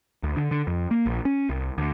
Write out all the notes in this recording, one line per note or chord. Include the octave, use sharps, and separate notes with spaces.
D2
D3
D3
F2
A#3
A#1
C#4
C2
D2